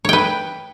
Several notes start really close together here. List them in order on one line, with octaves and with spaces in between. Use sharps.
C#5 G5 B4